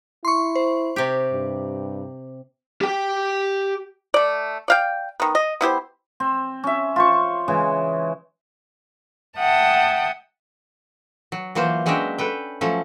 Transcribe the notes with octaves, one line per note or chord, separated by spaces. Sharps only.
E4 C6 C#6
C5
C3 G4
G2
G4 G5
A3 D5
D5 F5 G5
D#3 B3
D#5
B3 E4 G4 C5
C4
C#4 E5
F4 C5 C#6
C#3 E3 G#3
E5 F#5 G5 A5 D#6
F#3
E3 F#3 A#3 F4 C5
F#3 G#3 C#4 D4 E5 G5
A4 B4 G5
F3 F#3 A3 C#4